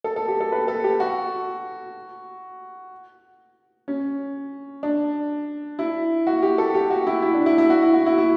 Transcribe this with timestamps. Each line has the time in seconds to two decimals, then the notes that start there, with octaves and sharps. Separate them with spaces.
0.04 A4
0.16 A4
0.28 G4
0.40 A4
0.52 B4
0.68 A4
0.84 G4
1.00 F#4
3.88 C#4
4.83 D4
5.79 E4
6.27 F#4
6.43 G4
6.58 A4
6.74 G4
6.90 F#4
7.07 E4
7.22 E4
7.34 D4
7.46 E4
7.58 E4
7.70 F#4
7.83 E4
7.94 F#4
8.06 E4
8.18 E4